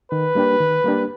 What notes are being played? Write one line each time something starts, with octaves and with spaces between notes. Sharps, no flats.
D#3 B4
G3 A#3 D4 G4
D#3
G3 A#3 D4 G4